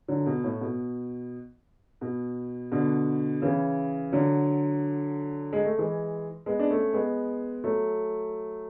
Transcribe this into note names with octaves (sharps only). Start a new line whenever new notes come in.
D3 F#3
B2
A2
B2
B2
B2 D3
C#3 E3
D3 F#3
G#3
A3
E3 G#3
G#3 B3
D4
A3 C#4
G#3 B3
F#3 A3